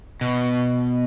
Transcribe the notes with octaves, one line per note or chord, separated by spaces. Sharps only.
B2